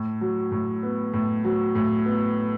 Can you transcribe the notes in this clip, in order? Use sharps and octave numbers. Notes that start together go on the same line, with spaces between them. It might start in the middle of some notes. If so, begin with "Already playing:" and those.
Already playing: A2
F#3
A2
B3
A2
F#3
A2
B3